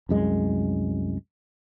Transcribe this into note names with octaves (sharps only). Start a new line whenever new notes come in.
C2 F#2 G#3